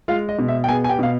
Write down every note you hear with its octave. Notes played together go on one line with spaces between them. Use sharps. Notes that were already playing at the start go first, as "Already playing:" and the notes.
G#3 F4 F5
D#5
B2
E5
G5
B3 G#4 G#5
G#5
G4 G5
B2 F5